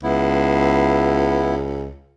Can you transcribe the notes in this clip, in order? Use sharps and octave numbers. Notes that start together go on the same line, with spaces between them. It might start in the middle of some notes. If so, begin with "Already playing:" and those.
C#2 B3 E4